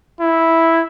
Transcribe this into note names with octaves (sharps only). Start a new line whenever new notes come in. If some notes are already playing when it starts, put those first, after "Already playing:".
E4